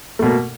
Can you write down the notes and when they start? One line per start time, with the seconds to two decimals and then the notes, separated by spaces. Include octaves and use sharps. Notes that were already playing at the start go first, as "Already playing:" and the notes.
0.19 A3
0.22 B2
0.26 A#3